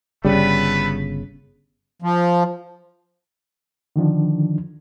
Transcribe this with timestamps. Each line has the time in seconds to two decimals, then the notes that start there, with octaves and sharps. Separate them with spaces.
0.25 G1 C#3 G3 A3 B3 B4
2.02 F3
3.96 D3 D#3 F3 D4